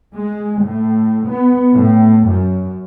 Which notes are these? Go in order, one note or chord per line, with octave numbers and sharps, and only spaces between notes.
G#3
A2
B3
A2
F#2